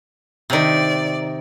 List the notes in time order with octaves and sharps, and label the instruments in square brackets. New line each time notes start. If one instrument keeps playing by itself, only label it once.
[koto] C3 D#3 [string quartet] D5